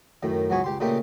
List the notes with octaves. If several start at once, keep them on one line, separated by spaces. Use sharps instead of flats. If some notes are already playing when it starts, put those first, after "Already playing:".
F#2 A2 D#3
C#2 G#2 F#3 B3 G#5 C#6
C#2 G4 C6
A#2 C#3 A3 D#4 F4 G4